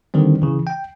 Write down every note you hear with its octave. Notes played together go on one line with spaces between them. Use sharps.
D3 D#3 G3 C4
C#3 E3
G5